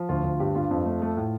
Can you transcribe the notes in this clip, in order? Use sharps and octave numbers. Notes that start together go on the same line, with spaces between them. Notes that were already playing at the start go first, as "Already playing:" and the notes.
Already playing: F3
D2 F4
D2
G2 G4
G2 F4
F2
A3
A3
A2